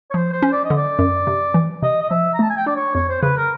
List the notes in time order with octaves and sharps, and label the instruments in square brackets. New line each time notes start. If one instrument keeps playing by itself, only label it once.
[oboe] C#5
[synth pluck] F3 [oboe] C5
[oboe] C5
[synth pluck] C#4
[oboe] D5
D#5
[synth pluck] D3
[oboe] D5
[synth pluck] F#2
C3
E3
[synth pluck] C3 [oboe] D#5
[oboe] D#5
[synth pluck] F3 [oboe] E5
[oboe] A#5
[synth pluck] A3 [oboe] A5
[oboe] G#5
G5
[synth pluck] D4 [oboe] D5
[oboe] C#5
[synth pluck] F2 [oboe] C#5
[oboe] C5
[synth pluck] C#3 [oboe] B4
[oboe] A#4